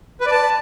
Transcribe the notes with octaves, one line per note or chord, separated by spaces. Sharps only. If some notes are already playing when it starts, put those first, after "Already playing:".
B4
D5
A5